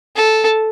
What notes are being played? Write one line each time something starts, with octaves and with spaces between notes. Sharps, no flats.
A4